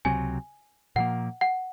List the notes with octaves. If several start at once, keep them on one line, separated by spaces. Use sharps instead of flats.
C#2 C3 F#3 C4 G#5
A#2 F3 A#3 F#5
F#5